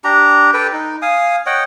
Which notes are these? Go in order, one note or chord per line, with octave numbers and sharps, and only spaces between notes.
D4 G4 A#5
A4 B4 G5
D#4
F5 G#5 D#6
C#5 D#5 F#5 G5